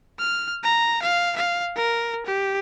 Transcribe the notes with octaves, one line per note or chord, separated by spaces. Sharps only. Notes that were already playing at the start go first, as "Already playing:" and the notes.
F6
A#5
F5
F5
A#4
G4